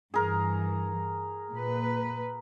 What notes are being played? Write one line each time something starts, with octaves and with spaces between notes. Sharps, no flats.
G2 E3 G#4 A#4
A#2 B4